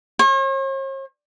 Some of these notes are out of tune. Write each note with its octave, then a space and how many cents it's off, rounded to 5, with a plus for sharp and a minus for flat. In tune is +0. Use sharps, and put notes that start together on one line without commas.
C#5 -45